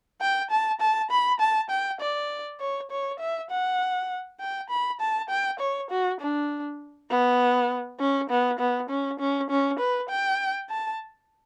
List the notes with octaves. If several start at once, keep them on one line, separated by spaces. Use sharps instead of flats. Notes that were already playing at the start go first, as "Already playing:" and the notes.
G5
A5
A5
B5
A5
G5
D5
C#5
C#5
E5
F#5
G5
B5
A5
G5
C#5
F#4
D4
B3
C#4
B3
B3
C#4
C#4
C#4
B4
G5
A5